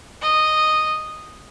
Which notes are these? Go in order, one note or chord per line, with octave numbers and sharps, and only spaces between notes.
D#5